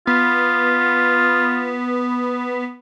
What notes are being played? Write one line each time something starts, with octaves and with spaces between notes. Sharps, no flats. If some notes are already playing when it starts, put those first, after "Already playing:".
B3 F4